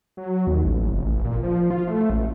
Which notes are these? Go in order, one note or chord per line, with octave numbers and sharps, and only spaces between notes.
F#3
D#2
A1
F1
A1
A#2
F3
F4
A3
A1